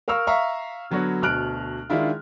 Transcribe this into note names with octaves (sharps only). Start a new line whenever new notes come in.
A#4 F5 C#6 E6 F6
E5 F5 A#5 C#6
D3 F#3 B3 F#4 C#5
D2 B2 F6 F#6 D7 F#7
D#3 G#3 D4 E4 F4